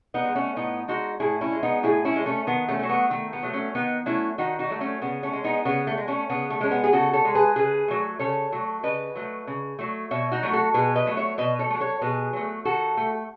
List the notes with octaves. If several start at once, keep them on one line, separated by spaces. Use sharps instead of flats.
B3 D#4
G#3
A3 C#4
A2 B3 D#4
G#3 D#4 F#4
A2 E4 G#4
C#4 E4
G#3
B3 D#4
A2 E4 G#4
C#4 E4
G#3
A3 C#4
D#3 B3
A3 C#4
F#3 A3
B3
D#3 A3
B3
F#3 A3
A3 C#4
D#3 B3 D#4
F#3 A3 C#4 E4
D#3 D#4 F#4
D#4 F#4
F#3 A3
A3 C#4
C#3 B3
A3 C#4
G#3
B3 D#4
C#3 B3
A3
G#3
A3 C#4
C#3 B3
A3
G#3 C#4
B3
G#4
C#3 F#4 A4
A4 C#5
G#3
G#4 B4
C#3 G#4 B4
F#3 A3
C#3 A4 C#5
F#3 A3
C#3 B4 D#5
F#3 A3
C#3
F#3 A3
B2 C#5 E5
D#4 F#4
F#3 A3
F#4 A4
B2 G#4 B4
B4 D#5
F#3 A3
C#5 E5
B2 B4 D#5
A4 C#5
A3
F#3
A4 C#5
B2 G#4 B4
F#3 A3
D#3 F#4 A4
A3